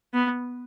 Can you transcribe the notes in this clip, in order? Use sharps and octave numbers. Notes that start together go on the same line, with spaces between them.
B3